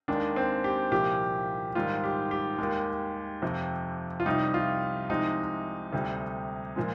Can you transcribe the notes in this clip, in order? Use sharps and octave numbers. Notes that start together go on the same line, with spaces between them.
D#2 D#3 G#3 D4
C4
G4
C2 A#2 F3 G4
G#2 D#3 G3 F4
G4
G4
D#2 D#3 G#3
F2 C3 F3
F4
C2 C3 G3 D#4
F4
C2 C3 F3 G#3 D#4
D2 C3 G3
A#2 F3 G#3